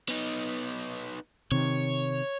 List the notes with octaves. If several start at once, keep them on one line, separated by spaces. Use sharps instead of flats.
B3 D#4
C3 D#3 C#5